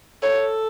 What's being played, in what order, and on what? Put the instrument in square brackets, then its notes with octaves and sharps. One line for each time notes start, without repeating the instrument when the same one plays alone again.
[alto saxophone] A4 [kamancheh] C#5